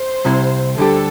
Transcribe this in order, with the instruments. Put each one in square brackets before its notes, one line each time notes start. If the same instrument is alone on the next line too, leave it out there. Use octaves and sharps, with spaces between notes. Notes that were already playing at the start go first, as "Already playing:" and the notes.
Already playing: [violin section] C5
[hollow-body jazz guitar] C2 C3 G3 E4
[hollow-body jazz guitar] D2 D3 G3 D4 G4 [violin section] A4